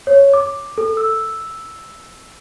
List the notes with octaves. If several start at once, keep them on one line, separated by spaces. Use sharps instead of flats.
C#5
D6
A4
E6